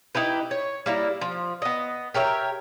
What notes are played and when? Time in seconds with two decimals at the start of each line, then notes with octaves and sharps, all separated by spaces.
0.15 D#4 E4 G4 B4
0.51 C#5
0.86 G3 A#3 E4
1.21 F3
1.62 B3 D#5
2.14 G4 A#4 C#5 E5